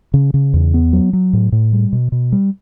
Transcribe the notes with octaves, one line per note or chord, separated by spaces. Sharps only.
C#3
C#3
E2
B3
F#3
F#3
A2
A2
G3
B2
B2
G3